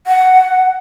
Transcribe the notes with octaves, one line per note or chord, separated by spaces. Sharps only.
F#5